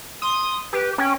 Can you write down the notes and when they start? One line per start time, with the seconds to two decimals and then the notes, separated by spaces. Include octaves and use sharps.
0.22 C6 D#6
0.73 G4 B4
0.98 C#4 G5